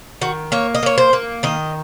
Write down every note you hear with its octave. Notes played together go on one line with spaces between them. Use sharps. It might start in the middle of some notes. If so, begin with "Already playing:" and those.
D#3 F#4
A#3 C#5
D#5
A#3 C#5
C5
A#3
D#3 D#5